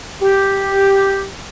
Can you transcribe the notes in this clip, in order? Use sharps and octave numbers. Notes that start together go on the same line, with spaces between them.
G4